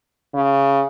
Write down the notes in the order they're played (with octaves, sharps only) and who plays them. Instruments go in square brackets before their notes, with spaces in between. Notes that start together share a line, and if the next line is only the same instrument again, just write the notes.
[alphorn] C#3